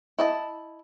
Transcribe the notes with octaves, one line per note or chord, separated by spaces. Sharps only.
E4 D#5 A5